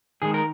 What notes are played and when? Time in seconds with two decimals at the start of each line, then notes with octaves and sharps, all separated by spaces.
0.22 D#3 G#3 G#4
0.34 A#4